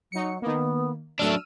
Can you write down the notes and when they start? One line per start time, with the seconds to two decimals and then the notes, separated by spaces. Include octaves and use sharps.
0.12 F#3 D#4 C#7
0.42 D#3 A#3 B3
1.19 F#3 A3 D4 E6 F6 D#7